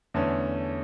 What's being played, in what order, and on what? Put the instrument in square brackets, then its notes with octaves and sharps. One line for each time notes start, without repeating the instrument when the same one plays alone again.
[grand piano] E2 D3 A3 C#4